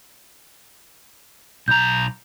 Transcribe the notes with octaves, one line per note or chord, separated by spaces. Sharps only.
B1 A#5 G6